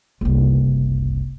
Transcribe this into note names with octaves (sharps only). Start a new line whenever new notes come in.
F#1 C2